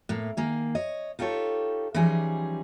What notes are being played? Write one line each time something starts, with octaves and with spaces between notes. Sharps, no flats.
A2 A#3
D#3 A#3 G#4
C#5 D#5
D#4 F4 G4 A4 C#5
E3 F3 G3 C#4 D#4 G#4